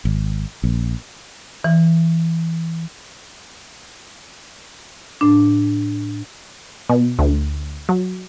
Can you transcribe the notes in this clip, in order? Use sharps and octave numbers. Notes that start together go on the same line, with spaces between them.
G#1
A#1
E3
A2 D4
B2
D2
F#3